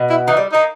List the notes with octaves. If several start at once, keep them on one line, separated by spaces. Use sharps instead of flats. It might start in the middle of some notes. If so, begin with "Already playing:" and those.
Already playing: B2
E4
E3 D#4
G3
A#3 D#4